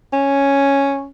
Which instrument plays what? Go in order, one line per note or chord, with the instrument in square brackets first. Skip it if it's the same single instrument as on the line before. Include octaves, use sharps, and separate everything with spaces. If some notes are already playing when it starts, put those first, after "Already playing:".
[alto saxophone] C#4